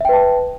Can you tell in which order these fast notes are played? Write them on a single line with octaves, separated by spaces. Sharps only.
E5 G5 B4 A5